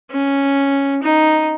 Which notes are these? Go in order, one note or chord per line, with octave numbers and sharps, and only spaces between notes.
C#4
D#4